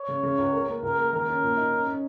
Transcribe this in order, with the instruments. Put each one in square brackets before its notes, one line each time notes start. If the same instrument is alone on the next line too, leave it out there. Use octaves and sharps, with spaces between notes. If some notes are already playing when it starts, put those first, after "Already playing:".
Already playing: [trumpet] C#5
[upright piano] C#3
C#3
C#2
A#4
A#3
[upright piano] C#2 [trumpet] A#4
[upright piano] A#3
[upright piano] D#3 [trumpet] A#4
[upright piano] C#4
A#2
D#4
C#4
C#4